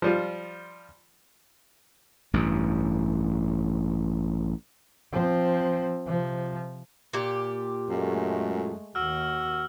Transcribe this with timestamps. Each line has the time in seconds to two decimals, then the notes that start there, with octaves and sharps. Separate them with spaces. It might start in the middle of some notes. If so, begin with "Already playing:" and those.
0.02 F3 G3 F4
2.34 A1 G2
5.12 F3 C4
6.07 C3 F3
7.13 A#2 G4
7.89 F#2 G#3 A3
8.95 D#2 F#4 E6 F6